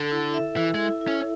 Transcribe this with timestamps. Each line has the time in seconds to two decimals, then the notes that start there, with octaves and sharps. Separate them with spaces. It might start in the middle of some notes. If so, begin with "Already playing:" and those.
Already playing: D3 A4
0.12 E4
0.34 E5
0.56 E3 E4
0.74 G#3
0.79 E4
1.01 E4
1.08 C#4